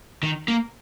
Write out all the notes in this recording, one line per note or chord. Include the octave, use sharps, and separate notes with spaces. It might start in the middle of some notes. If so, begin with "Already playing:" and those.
D#3
A#3